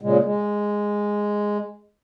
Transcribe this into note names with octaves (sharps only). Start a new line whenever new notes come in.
A#2 C#3 G#3
G#3